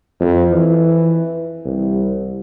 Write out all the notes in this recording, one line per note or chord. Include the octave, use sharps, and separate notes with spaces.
F2
E3
C2